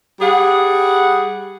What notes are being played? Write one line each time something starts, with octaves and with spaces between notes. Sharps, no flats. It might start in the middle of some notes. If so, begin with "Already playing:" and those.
G3 G#4 F#5